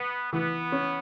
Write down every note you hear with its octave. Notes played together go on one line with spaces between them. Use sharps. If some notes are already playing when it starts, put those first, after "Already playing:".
Already playing: B3 B4
E3 B3
C#4